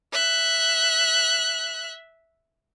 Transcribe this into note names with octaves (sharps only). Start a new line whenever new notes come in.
E5 F#6